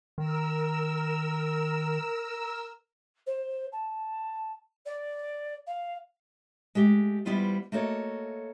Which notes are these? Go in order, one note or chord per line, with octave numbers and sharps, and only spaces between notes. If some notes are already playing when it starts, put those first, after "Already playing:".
D#3 A#4 E6
C5
A5
D5
F5
G#3 A3 G4
E3 G3 B3 E4 F4 C5
A3 A#3 F#4 A4 C#5 D#5